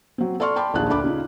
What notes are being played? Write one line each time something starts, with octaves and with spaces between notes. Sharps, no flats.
F#3 C4
A4 D5 C6 C#6 F6
G5 A5 B5 C6 D6
A#1 D#2 G#4 A5 F#6
D2 D4 B5 D6
C#3 D#4 F4